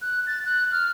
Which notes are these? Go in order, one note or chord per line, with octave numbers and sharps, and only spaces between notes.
F#6
A6
F#6
F6